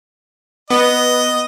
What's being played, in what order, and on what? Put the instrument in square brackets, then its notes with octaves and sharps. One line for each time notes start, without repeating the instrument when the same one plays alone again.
[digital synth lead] B3 [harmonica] D#5